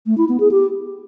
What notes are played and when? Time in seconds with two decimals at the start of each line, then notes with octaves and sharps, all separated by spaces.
0.06 A3
0.18 E4
0.29 B3
0.40 G#4
0.51 G4